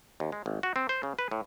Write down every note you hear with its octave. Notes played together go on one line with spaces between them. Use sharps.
D#2
G#3
G#1
F#4
C4
C5
C#3
B4
A2